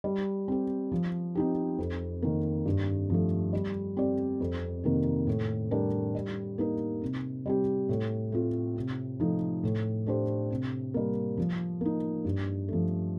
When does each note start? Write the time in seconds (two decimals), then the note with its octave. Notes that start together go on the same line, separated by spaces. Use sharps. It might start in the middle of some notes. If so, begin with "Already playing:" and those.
0.04 G3
0.48 C4 G4
0.92 F3
1.35 C4 D#4 G4
1.78 F2
2.22 D#3 A#3
2.66 G2
3.10 F3 A3
3.53 G3
3.97 C4 G4 D5
4.40 F2
4.84 C3 D#3 A#3
5.27 A2
5.71 G3 D4 G4 A#4
6.15 G3
6.58 A#3 D#4 A#4
7.02 C3
7.46 G3 C4 G4
7.89 A2
8.32 A3 C4 F4
8.76 C3
9.20 F3 A3 D#4
9.63 A2
10.06 A3 D4 G4 C5
10.50 C3
10.94 G3 A#3
11.37 F3
11.81 A#3 D#4
12.25 G2
12.68 F3 A3